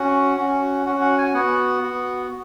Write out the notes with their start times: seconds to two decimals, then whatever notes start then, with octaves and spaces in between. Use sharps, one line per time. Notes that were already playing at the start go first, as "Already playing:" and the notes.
Already playing: C#4 F#4 F#5
0.38 C#4 F#4
0.86 C#4 F#4 F#5
1.02 F#5
1.18 G#5
1.34 B3 F#4 F#5
1.82 B3 F#4